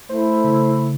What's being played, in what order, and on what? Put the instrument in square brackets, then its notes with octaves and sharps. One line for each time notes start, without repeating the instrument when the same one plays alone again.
[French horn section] A3 [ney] E4 [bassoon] C5
[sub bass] C#3